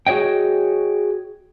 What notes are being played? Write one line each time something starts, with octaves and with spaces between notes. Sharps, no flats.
F#4 G#4 C#5 D#5 G5